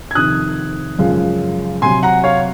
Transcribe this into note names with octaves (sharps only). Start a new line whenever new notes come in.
G#6
F2 C3 D#3 D#6 F#6
F#2 C#3 F3 G#3
C3 F#3 G#5 C6
F#5 A#5
C#5 F5